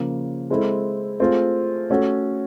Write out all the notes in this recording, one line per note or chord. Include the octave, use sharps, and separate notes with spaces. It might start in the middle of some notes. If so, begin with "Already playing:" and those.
Already playing: C#3 F3 A#3
G#3 C4 E4 A4
A3 C4 F4 G#4
A3 C#4 F#4 A4